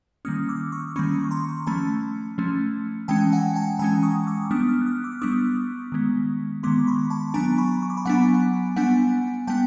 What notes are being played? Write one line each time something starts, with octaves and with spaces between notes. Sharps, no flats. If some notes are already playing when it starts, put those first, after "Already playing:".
D#3 G3 A#3 C#4 D#6 F6
D6 E6
C#6 D#6
D#3 G3 A#3 C#4 B5 C#6
C#6
A#5 C6
F3 A3 C#4 A5 B5
F3 A3 C#4
E3 G#3 C#4 G5 A5
F#5 G#5
G5 A5
E3 G#3 C#4 G#5 A#5
C#6 D#6
D6 E6
G3 B3 D4 D#6 F6
D#6 F6
F#6
D#6 F6
D6 E6
G3 B3 D4 C#6 D#6
D#3 G#3 B3
D#3 G#3 B3 C6 D6
B5 C#6
A5 B5
F#3 B3 D4 G#5 A#5
B5 C#6
C#6
D6
B5 C#6
F#3 B3 D4 F#5 G#5
G3 B3 D4 F#5 G#5
G3 B3 G5 A5